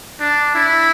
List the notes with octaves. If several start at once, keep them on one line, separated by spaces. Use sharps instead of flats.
D4
E4